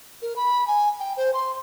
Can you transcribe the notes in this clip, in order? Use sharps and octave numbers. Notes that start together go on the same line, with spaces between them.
A#4
B5
G#5
G5
C5
C6